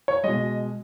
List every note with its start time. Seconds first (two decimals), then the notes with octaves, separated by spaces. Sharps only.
0.08 C#5
0.24 B2 G#3 D#5